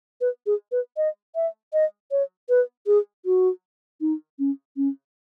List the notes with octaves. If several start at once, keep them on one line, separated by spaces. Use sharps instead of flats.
B4
G#4
B4
D#5
E5
D#5
C#5
B4
G#4
F#4
D#4
C#4
C#4